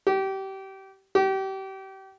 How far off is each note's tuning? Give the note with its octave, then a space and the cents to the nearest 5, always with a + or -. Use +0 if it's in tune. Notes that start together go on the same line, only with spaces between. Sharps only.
G4 -25
G4 -30